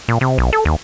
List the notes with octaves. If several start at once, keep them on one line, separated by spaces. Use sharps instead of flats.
A#2
C3
B1
A4
D#2